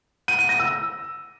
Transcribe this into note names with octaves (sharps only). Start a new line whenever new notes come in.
D#7
D#7
A#6
E6